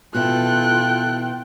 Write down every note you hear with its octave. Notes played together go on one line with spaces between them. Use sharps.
B2 B3 E4 F4 A4 G5 F#6